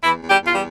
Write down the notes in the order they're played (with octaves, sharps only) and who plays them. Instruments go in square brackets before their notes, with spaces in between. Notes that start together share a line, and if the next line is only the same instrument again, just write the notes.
[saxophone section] E2 E3 E4
E2
G3 G4
E2 F4
G3